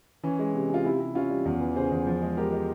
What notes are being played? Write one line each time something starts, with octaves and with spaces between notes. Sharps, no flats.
E3 C#4
G#3
C3
C3 F4
C3 E4
C3
C3 C#4 F4
G3
E2
E3
C#3 G#4 C5
E2
F3
G#3
G#3 G4 A#4
G#3